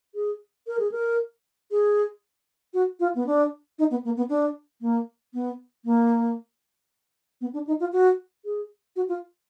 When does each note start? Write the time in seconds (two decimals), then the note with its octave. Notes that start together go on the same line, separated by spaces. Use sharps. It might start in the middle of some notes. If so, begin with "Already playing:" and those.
0.15 G#4
0.67 A#4
0.79 G#4
0.91 A#4
1.71 G#4
2.74 F#4
3.00 F4
3.15 B3
3.26 D4
3.79 D#4
3.91 B3
4.05 A#3
4.17 B3
4.29 D4
4.81 A#3
5.34 B3
5.85 A#3
7.41 B3
7.54 D4
7.67 D#4
7.80 F4
7.93 F#4
8.45 G#4
8.96 F#4
9.09 F4